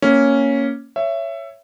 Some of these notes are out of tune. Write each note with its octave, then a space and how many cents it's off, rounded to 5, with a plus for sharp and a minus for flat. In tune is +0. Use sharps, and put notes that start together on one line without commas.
A#3 +0 C#4 +0
C#5 +0 E5 +20